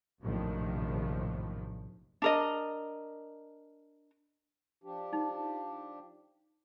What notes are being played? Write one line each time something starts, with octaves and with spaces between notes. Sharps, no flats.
A#1 F#2 A2 C3 D#3 F3
D4 A#4 D#5
F3 D4 G4
D#4